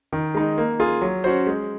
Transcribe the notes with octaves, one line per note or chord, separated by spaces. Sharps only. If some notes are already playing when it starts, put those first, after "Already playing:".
D#3
G#3 D#4
A#3
F4 G#4
F#3
C#4 F#4 C5
G#3